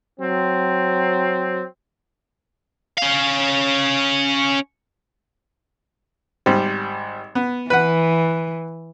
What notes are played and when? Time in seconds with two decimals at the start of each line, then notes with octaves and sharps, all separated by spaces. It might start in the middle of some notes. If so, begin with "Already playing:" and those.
0.20 F#3 C4
2.98 C#4 F5
6.46 G#1 G3 C5
7.35 B3
7.70 E3 B4 F#5